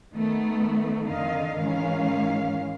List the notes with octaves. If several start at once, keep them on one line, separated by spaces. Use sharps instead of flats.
D#3 A3 B3
F2 D3 D#3 D#5 F5
G#2 D#3 E3 G#3 C#4 F5